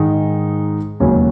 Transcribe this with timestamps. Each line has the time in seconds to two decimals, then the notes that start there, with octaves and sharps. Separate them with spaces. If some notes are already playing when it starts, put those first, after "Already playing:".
Already playing: G#2 D#3 G#3 D#4
1.00 E1 D#2 C#3 F#3 C#4